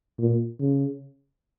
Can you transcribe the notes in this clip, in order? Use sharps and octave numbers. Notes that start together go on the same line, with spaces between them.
A#2
C#3